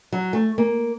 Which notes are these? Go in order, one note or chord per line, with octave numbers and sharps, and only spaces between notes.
F#3
A3
A#3